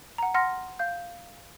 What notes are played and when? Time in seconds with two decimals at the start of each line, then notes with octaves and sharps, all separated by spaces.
0.18 F#5 A#5
0.34 F#5 C6 F6 A#6
0.79 F5 G6